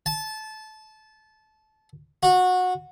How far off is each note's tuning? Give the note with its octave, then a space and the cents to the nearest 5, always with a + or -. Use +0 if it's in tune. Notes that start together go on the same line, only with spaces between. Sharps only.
A5 -20
F#4 -20